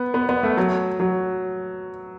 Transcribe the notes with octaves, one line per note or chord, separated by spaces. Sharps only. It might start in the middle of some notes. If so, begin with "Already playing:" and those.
Already playing: B3
B3
B3
A3
F#3
F#3